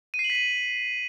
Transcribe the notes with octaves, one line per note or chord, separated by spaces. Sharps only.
D#7
C7
F#7
B6
D#7